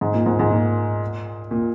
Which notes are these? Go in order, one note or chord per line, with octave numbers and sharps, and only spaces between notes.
G#2
A#2
G#2
G#2
A#2
A#2